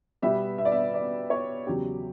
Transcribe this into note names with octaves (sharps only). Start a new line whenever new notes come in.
B2 G3 B3 E5
E5
D5
E5
D5
C#5
E2 C#3 F#3 G4